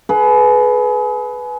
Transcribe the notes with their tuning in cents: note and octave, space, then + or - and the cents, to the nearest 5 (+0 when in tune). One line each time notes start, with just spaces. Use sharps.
G#4 +35 B4 +0